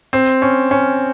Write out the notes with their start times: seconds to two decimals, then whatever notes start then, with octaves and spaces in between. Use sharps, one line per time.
0.13 C4
0.42 C#4
0.71 C#4